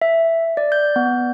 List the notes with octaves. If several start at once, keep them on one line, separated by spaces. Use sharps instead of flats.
E5
D5
G6
B3